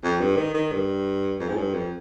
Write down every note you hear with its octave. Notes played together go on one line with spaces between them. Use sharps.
F2
G2
D#3
D#3
G2
F2
G#2
G2
F2